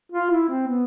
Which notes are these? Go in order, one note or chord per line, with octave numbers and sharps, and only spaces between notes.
F4
E4
C4
B3